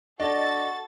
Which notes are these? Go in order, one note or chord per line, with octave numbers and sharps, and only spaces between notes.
D4 F#4 A4 D#5 A6